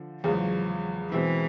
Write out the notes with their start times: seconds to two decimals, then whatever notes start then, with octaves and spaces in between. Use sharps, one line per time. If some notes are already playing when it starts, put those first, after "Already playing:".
Already playing: D3 F3
0.23 E2 C#3 F3 F#3 G#3
1.11 B2 E3 G#3 C4 E4